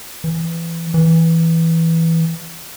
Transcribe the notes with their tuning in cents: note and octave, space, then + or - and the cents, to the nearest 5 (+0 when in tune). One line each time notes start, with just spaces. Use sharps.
E3 +15
E3 -5